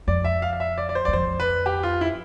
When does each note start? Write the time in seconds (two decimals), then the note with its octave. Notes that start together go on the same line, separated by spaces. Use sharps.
0.07 F2 D5
0.24 E5
0.42 F5
0.53 F5
0.60 E5
0.78 D5
0.89 D5
0.95 C5
1.05 E2 D5
1.13 F2 C5
1.40 B4
1.66 G4
1.83 F4
2.01 E4